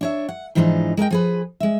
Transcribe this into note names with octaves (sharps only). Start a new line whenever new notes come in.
D4 C#5 E5
F#5
G#2 E3 F3 B3 D4 D#4
G#3 A#4 D#5 G5
F3 G#4 B4
G#3 E5